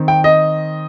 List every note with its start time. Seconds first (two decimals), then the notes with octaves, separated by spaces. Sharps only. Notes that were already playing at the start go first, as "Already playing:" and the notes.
Already playing: D#3 C4
0.08 G5
0.24 D#5